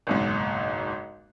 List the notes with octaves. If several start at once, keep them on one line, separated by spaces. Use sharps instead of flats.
F#1 B1 G#2